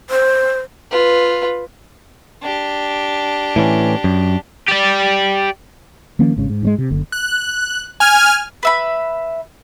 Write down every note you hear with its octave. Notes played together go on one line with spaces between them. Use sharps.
C5
F4 B4
D4 G4
A2 E3 C#4
F#2
G4 D5
D#3 F3 A#3 C#4
G#1 G#2 C#3
G#2
G#2 F#3 G#3
C3
F#1 D3
F#6
G#5 F6
B4 E5 B5